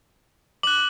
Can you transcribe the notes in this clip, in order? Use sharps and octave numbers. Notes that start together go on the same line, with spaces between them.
D6 F#6 F#7